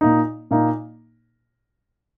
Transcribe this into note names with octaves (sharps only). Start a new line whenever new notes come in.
A#2 A#3 D#4
A#2 A#3 D#4